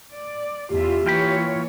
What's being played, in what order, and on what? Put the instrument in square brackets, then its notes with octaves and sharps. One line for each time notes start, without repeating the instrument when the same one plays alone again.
[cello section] D5
[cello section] E2 F4 E5 [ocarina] G4
[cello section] E3 A#3 C#5 [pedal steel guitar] F4 G5 B5